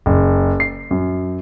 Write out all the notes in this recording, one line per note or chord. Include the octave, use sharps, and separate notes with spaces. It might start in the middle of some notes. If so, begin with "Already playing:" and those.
F#1
C7
F#2